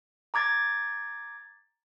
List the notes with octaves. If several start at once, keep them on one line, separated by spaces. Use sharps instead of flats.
A#5 D6 G#6 A6